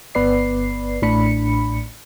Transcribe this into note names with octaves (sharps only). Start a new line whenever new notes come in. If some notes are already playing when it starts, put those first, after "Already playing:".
G1 B3 B4 D5 C7
A1 A2 D4 B5 C#7